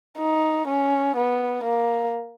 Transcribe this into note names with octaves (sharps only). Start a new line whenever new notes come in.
D#4
C#4
B3
A#3